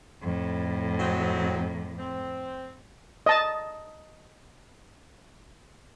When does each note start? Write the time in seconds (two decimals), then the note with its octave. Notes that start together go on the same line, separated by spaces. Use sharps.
0.22 F2 A2
1.00 F#3 G#3 C4
1.98 C4
3.26 D#5 A5